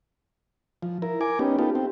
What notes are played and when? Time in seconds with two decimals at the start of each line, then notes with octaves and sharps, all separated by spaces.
0.82 F3
1.02 E4 A#4
1.21 A#4 G#5 D6
1.39 B3 C#4 D#4 G4
1.59 B3 D#4 F4 G4 A4
1.75 C4 G4